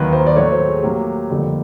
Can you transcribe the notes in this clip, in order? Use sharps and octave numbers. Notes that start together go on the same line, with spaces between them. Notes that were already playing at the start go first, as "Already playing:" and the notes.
Already playing: D#2 D#3 F#3 A#3 B4
C5
D5
A2 F#3 A3 C#5
C5
G#4
A2 F#3 A#3 G4
F2 D3 G3 A#3